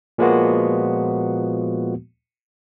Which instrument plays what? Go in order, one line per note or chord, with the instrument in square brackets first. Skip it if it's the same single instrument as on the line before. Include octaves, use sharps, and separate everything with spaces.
[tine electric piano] A#2 F3 G#3 A#3 B3 F#4